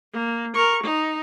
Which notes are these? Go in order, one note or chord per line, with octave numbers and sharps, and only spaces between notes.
A#3
A#4 C#6
D#4